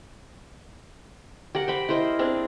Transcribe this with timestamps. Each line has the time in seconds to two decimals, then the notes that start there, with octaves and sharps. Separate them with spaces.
1.55 G4 A#4 F#5
1.68 C5 G5 B5
1.89 E4 A#4 C5 D#5
2.19 C4 D4 G#4